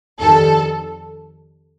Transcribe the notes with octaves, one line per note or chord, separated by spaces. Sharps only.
F2 D#3 G3 A4